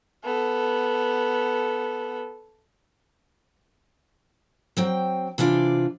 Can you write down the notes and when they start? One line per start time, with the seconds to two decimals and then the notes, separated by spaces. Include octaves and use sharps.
0.24 B3 A4
4.77 F#3 C4 G5
5.38 C3 E3 D4 F4 D5